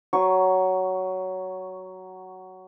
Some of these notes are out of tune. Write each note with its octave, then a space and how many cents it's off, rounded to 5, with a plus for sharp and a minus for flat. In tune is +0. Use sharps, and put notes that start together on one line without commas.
F#3 +10 C#6 +0